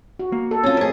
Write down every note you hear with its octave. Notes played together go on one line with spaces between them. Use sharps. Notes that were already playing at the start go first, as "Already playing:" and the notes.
F#4
A#3
A4
C4 C#4 F4
F2 A3 G#4 A#4